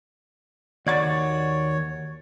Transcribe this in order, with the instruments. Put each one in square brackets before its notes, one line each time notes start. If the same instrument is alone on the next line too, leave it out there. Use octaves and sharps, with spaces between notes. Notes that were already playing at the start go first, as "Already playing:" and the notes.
[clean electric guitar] D#2 F#4 [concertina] C#5 [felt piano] D5 G#6 A6